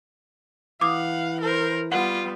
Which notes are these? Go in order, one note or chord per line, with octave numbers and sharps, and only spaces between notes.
E3 F5 F#5 D6 D#6
A#4 C5
G3 B3 F4 F#5